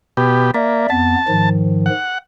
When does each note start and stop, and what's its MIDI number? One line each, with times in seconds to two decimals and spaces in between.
0.17 0.51 47
0.17 0.51 67
0.54 0.87 58
0.54 0.90 74
0.54 0.90 76
0.90 1.15 41
0.90 1.15 59
0.90 1.49 81
1.28 1.89 44
1.28 1.89 51
1.28 1.89 53
1.86 2.18 78